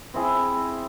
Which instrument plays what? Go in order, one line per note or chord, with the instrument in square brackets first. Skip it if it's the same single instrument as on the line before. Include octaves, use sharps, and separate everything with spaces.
[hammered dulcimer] C4 E4 G#4